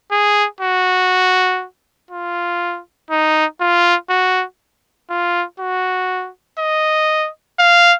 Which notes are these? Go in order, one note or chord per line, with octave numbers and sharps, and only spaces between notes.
G#4
F#4
F4
D#4
F4
F#4
F4
F#4
D#5
F5